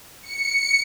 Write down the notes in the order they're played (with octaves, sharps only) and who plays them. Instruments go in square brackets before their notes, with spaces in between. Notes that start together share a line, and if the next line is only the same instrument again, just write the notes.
[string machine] C#7